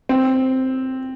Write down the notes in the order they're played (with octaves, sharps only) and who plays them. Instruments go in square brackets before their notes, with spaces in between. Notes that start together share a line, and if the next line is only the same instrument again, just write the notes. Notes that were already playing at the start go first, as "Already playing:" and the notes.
[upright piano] C4